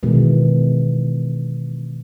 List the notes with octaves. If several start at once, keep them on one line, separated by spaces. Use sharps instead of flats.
B2 D#3 E3 G#3